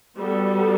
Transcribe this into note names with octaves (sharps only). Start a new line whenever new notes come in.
G3 B3 F#4 A4